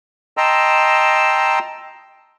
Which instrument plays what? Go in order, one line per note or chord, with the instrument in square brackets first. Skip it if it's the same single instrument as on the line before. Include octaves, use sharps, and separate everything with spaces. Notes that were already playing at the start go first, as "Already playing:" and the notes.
[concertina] D#5 G5 A5 A#5 C6 E6